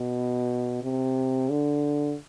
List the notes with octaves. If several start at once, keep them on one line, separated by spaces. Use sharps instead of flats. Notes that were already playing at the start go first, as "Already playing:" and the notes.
Already playing: B2
C3
D3